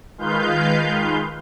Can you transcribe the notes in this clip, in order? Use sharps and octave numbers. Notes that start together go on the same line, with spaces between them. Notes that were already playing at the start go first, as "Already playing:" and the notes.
D#3 G#3 F4 B4 F5 G6